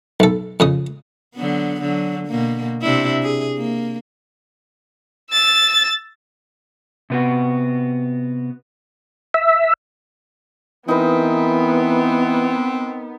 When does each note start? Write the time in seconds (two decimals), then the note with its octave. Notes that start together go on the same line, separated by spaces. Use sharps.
0.20 B1 A4
0.60 F2 C#3 D#6
1.35 D3 F#3 B3
1.81 D3 F#3
2.28 B2 A#3
2.82 C3 D4 E4
3.22 G#4
3.57 A#3
5.32 E6 A6
7.10 C3 B3 F#4
9.34 E5
10.88 E3 B3 C4 D#4 A#4 B4